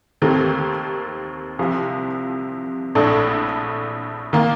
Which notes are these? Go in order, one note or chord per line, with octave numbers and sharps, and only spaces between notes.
D#2 D#3 A3 C4 G4
C2 C3 F3
A#1 A2 A3 D4
D#3 A#3